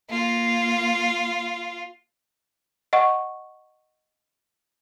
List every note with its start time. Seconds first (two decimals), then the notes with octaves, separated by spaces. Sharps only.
0.10 A#3 F4
2.93 D#5 F#5 C#6